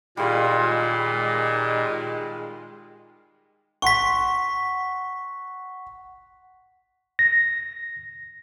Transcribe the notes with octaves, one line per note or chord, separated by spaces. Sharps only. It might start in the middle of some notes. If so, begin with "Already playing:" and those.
A#2 D#3 G3 G#3 F4
F#5 C6 C#6 B6
A#6